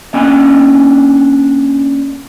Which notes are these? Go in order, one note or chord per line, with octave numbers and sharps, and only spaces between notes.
A#3 C#4 D4 D#5 G5 G#5